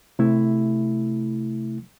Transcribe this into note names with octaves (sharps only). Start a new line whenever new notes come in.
C3 A3 E4